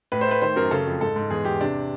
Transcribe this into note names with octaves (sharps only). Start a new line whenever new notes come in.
A2 B4
C5
A3 B4
D#3 C5
F#2 A#4
C#3 A4
F2
G#2 A4
G#2
E2 G#4
E2 G4
C3 D4